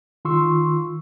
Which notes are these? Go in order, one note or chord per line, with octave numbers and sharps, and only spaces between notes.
D#3 F4 C6 C#6 E6